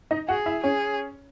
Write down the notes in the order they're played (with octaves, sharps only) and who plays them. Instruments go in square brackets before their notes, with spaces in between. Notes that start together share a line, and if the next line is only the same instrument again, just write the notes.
[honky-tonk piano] D#4 D#5
[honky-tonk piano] F#4 F#5 [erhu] G#4
[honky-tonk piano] E4 E5
[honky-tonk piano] C#4 C#5 [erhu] G#4